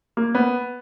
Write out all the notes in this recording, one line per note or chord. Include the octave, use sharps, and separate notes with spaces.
A#3
B3